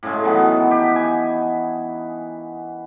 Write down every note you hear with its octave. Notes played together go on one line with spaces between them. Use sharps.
A2 C#3 G#3
D#3 E3 F#3 B3
G4
G#5